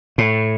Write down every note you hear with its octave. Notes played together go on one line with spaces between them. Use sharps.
A2